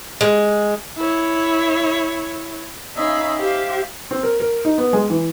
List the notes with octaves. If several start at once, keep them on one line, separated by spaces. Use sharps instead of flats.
G#3
E4 C#5
C#4 D#4 E5 F5 B5
G4 C5 E5 F5
C4
A#4
A#4
D#4
B3
G#3
E3